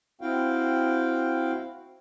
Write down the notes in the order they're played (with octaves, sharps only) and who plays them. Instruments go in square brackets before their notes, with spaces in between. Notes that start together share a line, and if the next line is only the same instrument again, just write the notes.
[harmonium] C4 E4 F#4 F5 G5